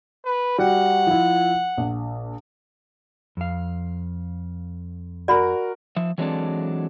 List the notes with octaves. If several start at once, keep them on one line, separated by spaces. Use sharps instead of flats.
B4
G3 F#4 F#5
F3 E4
A#1
F2 F5
F#4 A#4 D5 B5
F3 E5
E3 F#3 G#3 C4 D4 A4